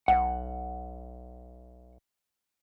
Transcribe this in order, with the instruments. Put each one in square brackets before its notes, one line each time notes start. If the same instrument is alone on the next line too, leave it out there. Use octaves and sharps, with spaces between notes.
[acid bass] B1 [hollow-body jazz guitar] F#5